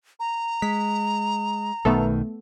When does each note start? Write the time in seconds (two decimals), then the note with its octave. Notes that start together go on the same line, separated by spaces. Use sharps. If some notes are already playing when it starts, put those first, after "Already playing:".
0.20 A#5
0.62 G#3 B6
1.85 B1 B2 D#3 A3 B3 A4